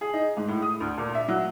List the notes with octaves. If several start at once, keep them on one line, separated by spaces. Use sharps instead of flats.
G#4
D#4
G#2
A2
D#6
D2
A#2
E5
F#3